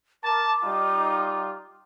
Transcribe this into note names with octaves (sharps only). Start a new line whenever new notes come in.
A#4 A5 D6
G3 D#4 F4